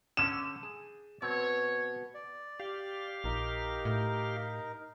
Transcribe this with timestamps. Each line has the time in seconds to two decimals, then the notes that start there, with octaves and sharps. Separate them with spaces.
0.17 D3 C#4 E7
0.63 G#4
1.22 B2 C4 C#5
2.14 D5
2.60 G4 F5
3.24 A#1 D#4 A#4
3.85 A2